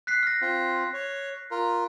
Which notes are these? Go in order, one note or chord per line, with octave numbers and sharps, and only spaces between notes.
F#6 B6 C7
F6 A#6
C4 F4
C#5
F4 A#4